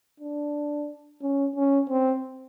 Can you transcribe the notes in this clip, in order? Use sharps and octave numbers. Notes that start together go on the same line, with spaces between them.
D4
C#4
C#4
C4